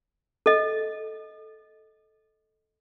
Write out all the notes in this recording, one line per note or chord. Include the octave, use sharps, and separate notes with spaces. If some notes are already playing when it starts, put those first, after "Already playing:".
A4 D#5